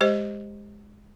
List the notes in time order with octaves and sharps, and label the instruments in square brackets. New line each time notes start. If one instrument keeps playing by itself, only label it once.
[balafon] G#3 G4 C5 D#5